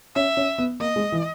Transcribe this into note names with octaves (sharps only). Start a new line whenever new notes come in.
C#4 E5
C#4
B3
A#3 D#5
G#3
E3